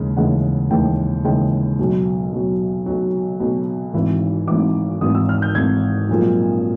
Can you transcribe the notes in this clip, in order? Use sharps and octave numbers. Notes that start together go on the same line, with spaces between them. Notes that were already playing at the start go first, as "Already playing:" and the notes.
Already playing: D#2 C#3 E3 G#3
D#2 C#3 E3 G#3 F#5
D#2 C#3 E3 G#3 G5
D#2 C#3 E3 G#3 G5
B1 B2 F#3
B1 B2 F#3
B1 B2 F#3
B1 B2 F#3
G#1 G#2 E3
G#1 G#2 E3 D6
G#1 G#2 E3 D#6
E6
F6
G6
G#1 G#2 E3 G#6
B1 A#2 F3 G#3